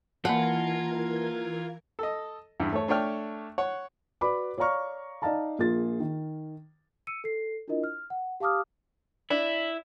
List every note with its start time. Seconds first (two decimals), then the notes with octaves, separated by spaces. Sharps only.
0.25 E3 A#3 F4 A#4 F#5 G#5 A5 G#6
1.99 A4 D#5
2.60 E2 G2
2.73 A3 C#5
2.88 A3 D4 C#5 G5 F6
3.58 C#5 F#5
4.21 F#4 B4 D5 B5 D6
4.58 C#5 D5 F5 A#5 C#6 F6
5.22 D#4 D5 D#5 F5 A5 A#5
5.58 A#1 A#3 F4 G#4 A6
6.00 D#3
7.07 E6 C#7 D#7
7.24 A4 C7
7.68 D4 E4 F4 A#4 D#5
7.84 F6
8.10 F#5
8.40 G4 F5 A5 D6 D#6 F6
9.30 D4 E4